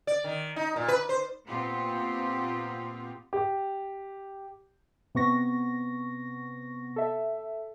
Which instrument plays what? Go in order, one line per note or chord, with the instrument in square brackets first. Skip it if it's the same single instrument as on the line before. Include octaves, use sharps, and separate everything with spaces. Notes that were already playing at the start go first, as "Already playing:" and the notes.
[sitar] D5
D#3
D#4
A#2
B4
C5
[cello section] A#2 B3 C4 F4 G4
[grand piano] G4
[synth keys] C3 B3 C#6 A#6
A4 E5